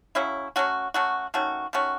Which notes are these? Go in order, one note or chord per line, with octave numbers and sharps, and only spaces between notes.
C#3 F#3 C#4 E4
F#3 A3 C#4 F#4
F#3 A3 C#4 F#4
D#3 A3 C#4 F#4
D#3 A3 C#4 F#4